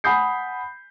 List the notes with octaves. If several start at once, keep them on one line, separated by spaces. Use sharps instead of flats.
F#5 G#5 B5 D#6 G6 C7